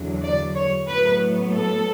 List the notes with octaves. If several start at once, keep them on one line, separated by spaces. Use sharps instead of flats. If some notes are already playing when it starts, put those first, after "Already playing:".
Already playing: E2 D3 F#3
D5
C#5
A2 F#3 B3 B4
A4